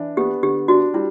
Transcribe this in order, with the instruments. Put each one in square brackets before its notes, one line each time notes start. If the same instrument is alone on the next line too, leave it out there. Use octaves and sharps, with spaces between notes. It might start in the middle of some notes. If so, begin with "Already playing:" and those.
Already playing: [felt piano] E3 D4
[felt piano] B3 [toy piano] G4
[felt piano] D3 [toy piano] G4
[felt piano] D4 [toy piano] F#4
[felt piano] G3 [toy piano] E4